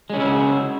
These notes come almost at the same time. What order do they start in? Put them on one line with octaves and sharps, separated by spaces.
G#3 C#4 C#3 E4 F#4